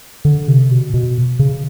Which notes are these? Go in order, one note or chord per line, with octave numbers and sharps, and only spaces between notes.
D3
C3
B2
B2
C#3